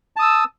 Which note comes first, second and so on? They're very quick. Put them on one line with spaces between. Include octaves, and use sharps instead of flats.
A5 D#6 E6